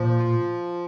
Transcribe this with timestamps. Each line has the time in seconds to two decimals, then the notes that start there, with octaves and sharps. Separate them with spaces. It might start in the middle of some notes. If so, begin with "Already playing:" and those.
Already playing: A#2 F3
0.20 F4